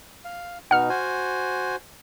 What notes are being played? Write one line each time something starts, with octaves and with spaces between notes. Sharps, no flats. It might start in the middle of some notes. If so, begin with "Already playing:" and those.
F5
B2 D#4 F#5 F6
F#4 C5 G#5